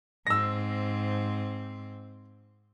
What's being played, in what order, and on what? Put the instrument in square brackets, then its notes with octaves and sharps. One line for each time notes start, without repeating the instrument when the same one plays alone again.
[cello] G#2 C4 [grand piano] E6 A#6